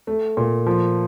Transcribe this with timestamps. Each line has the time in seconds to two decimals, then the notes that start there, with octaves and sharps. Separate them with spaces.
0.07 A3
0.37 A#2
0.66 F3